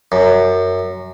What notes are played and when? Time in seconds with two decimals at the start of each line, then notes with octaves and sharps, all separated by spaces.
0.12 F#2